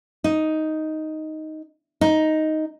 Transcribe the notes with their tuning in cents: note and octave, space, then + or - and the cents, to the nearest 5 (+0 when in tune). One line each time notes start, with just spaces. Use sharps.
D#4 +5
D#4 +5